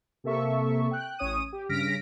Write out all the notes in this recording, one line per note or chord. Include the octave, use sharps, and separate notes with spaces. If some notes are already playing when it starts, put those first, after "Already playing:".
C3 A#3 A4 E5 C#6
G5 F#6
A1 C#4 C#5 D#6 D#7
G4
G2 C#3 F6 A#6 B6 D7